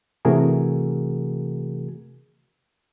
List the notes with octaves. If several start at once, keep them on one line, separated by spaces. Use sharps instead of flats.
C3 E3 A3 F#4 G#4 A#4